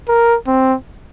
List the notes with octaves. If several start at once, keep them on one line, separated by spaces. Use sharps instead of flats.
A#4
C4